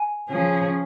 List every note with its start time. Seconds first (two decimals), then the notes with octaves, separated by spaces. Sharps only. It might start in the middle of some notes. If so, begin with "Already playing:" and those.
Already playing: G#5
0.30 C#3 F3 C#4 G#4